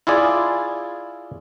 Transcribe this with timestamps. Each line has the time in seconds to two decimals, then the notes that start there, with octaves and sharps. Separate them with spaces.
0.07 E4 F4 G#4 D5